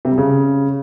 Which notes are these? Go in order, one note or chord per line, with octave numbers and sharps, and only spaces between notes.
C3
G3
C#3